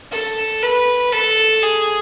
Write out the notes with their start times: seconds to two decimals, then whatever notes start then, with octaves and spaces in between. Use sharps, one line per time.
0.12 A4
0.63 B4
1.12 A4
1.62 G#4